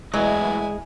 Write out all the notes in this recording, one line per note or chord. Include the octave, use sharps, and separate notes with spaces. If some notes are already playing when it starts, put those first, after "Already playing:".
E2 A2 F#3 G#3 E4 B4 D#5 G#5